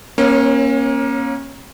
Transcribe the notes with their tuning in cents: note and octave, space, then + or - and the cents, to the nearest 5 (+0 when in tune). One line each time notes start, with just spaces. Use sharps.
A#3 +20 C#4 -25 C#5 +0